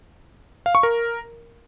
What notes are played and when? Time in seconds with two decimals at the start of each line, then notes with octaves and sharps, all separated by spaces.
0.66 F5
0.75 C#6
0.83 A#4